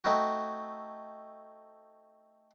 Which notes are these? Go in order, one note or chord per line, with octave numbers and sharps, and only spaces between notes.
A3 C4 D#4 E4 F#4